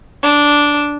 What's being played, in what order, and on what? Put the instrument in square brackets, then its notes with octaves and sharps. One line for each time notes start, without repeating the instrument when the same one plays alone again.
[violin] D4